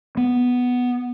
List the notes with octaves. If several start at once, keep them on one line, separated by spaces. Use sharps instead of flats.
B3